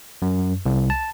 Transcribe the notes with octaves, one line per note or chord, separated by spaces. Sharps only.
F#2
C2
A5